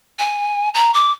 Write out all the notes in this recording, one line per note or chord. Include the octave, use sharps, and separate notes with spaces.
G#5
A#5
D6